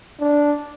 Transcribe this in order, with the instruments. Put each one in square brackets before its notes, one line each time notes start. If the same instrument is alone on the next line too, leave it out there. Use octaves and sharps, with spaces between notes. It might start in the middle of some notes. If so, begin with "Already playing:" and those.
[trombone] D4